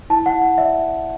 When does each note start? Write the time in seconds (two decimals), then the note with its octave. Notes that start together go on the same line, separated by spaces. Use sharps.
0.10 E4 A5
0.26 F#5
0.33 E4
0.42 F#5
0.58 D5 E5